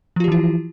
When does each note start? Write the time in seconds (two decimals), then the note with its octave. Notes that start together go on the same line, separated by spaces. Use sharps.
0.16 F3
0.20 F4
0.24 G4
0.28 E3
0.32 E4